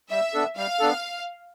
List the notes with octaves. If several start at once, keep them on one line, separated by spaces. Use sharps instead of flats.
G3 E5
B3 D4 A4
G3 F5
B3 D4 A4